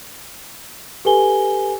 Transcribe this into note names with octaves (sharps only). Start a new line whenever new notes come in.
G4 A4 B4 G#5 G7